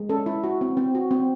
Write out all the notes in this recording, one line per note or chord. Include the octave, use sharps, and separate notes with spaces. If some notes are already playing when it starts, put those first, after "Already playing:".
Already playing: G#3
C#4 A4
E4
F#4
C4
C4
F#4
C4